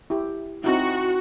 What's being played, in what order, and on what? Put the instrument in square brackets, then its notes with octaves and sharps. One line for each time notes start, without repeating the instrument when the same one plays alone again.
[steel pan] E4 G4
[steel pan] C4 D#4 E4 [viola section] F#4